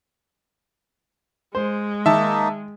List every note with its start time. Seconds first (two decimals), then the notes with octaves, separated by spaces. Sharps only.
1.55 G#3 C5
2.06 D#3 A#3 D#4 E5 A5